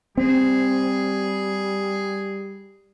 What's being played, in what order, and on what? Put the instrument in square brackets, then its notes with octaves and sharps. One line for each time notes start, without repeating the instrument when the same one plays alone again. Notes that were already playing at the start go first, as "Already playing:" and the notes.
[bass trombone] G3 [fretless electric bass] C4 [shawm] G#4